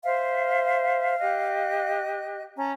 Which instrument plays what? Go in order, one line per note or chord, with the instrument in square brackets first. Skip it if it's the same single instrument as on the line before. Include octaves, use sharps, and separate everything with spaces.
[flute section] C5 E5 [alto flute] F5
[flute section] G4 D#5 F#6
C#4 A5 A#5